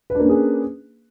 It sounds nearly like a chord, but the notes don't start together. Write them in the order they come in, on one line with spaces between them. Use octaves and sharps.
B4 D4 A#3 C#4 G#4